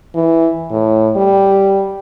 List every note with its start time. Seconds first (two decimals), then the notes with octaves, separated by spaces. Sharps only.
0.15 E3
0.71 A2
1.16 G3